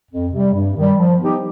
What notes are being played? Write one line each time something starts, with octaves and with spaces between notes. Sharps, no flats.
F2
C3 G3
G2
D#3 G3
F3
B3 D#4 G4